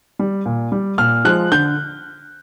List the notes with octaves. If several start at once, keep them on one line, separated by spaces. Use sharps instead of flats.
G3
A#2
G3
A#2 F6
F3 G#3 F#6
D3 G6